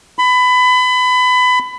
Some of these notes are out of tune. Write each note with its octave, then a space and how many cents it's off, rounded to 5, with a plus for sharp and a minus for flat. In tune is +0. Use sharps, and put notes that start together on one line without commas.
B5 +25